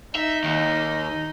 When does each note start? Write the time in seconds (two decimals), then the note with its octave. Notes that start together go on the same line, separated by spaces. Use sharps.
0.15 D#4 E5
0.44 D#2